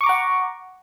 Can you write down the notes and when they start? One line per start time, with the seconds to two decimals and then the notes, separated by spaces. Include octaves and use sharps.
0.01 C#6
0.04 D6
0.06 A#5
0.09 F#5